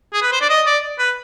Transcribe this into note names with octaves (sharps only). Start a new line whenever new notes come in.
G#4
B4
C5
D5
D#5
D5
B4